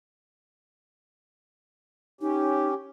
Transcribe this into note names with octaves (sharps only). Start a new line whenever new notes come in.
C#4 D#4 G4